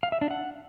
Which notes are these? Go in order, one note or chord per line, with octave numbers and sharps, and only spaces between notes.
F5
E5
D4
F#5